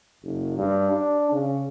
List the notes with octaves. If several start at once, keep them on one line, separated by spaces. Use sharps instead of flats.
F#1
G2
D4
C#3